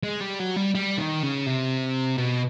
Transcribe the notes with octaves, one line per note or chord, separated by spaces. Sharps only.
G#3
G3
F#3
G3
G3
D#3
C#3
C3
B2